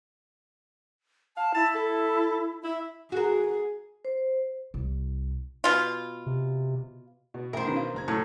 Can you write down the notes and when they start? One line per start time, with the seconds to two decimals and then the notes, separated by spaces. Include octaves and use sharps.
1.37 F5 A5
1.55 E4 A5
1.75 A4
2.64 E4 E5
3.12 F#4 G#4 A#4
4.05 C5
4.74 C2
5.64 B2 F4
6.26 C3
7.34 B2
7.53 A1 A2 A#4 C5 E5 G5
7.65 B2 D#3 B3 C#4 D4
7.76 F5
7.94 F#1 A#5 G#6
8.08 A2 F#3